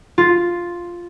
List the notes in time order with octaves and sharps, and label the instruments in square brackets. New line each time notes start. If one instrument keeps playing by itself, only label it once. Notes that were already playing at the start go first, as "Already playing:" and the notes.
[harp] F4